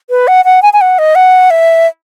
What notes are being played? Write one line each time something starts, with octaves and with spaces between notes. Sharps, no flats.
B4
F#5
F#5
G#5
G#5
F#5
D#5
F#5
E5